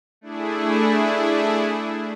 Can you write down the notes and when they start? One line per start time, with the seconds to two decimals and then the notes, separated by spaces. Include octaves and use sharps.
0.21 A3 D4 E4 G#4